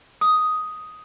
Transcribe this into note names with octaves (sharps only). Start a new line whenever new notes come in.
D#6